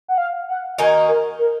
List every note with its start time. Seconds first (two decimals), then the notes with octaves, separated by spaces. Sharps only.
0.08 F#5
0.18 F5
0.49 F#5
0.78 D#3 A#3 D#4 F#4 G#5
1.09 A#4
1.39 A#4